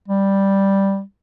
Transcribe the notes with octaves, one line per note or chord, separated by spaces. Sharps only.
G3